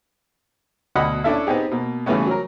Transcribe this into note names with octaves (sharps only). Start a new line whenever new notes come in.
D2 B2 D#5 F#5 B5
C#4 D4 E4 A4 E5
B3 C4 D#4 G4 G#4
B2 A#3
C#3 E3 G3 A3 B3 C#4
F#3 A#4